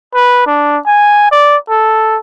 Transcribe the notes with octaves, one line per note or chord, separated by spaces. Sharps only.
B4
D4
G#5
D5
A4